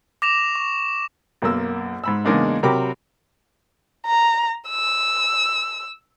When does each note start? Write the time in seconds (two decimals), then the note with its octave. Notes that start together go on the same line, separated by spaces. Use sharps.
0.22 D6 A#6 E7 F7
0.55 C#6
1.42 B1 F#2 A#3 E6
2.04 G#2 B5 E6
2.25 E2 C#3 G#3 A#3 D4 D#4
2.63 C3 F#3 A#4 G5 B5 D6
4.06 A#5
4.69 E6